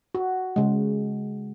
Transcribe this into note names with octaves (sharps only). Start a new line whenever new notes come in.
F#4
C#3 G#3